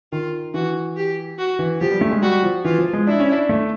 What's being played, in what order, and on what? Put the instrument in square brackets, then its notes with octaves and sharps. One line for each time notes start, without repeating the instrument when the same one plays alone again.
[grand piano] D#3 [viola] F4
[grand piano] E3 [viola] F#4
[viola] G4
F#4
[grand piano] E3
[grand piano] F3 [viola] G4
[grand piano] G3
A3
G#3
[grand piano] G3 [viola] F#4
[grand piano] F3
[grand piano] E3 [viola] F4
[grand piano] F3
G#3
[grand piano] D4 [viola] E4
[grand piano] C#4
D4
A3